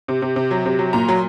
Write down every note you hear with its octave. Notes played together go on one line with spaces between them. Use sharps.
C3
C3
C3
F#3
C3
F#3
A#2 A#5
F#3